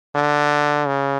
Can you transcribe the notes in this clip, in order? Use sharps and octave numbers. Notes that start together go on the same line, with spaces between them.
D3
C#3